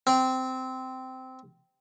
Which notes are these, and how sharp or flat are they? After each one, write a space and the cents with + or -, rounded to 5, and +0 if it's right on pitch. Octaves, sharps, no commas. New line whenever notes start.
C4 -15